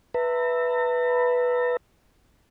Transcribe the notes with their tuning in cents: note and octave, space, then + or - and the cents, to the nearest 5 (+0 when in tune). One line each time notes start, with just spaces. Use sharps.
B4 -5 E5 +0 A#5 -45